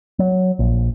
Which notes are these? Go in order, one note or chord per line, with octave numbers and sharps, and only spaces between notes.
F#3
A#1